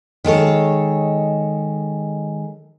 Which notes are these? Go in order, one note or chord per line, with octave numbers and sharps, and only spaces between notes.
D#3 G#3 A4 C#5